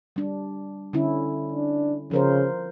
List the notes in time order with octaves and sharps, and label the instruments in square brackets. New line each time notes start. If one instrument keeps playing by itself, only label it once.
[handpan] G3 D4
D3 C#4 E4
[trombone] D4
[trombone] C#3 [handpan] F3 A#4 C5